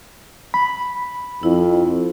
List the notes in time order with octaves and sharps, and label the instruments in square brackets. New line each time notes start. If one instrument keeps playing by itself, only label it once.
[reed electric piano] B5
[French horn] F2 [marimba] E4